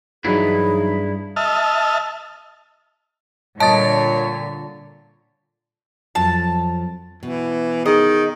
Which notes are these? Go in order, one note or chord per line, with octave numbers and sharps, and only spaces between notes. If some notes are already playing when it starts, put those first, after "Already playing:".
G2 E3 F#3 D#4 E4 G#4
D#5 E5 A5 F6
A#2 D3 G3 C#5 D#5 A5 A6
F2 F3 F#3 A5
B2 E3
D#3 G#4 D#5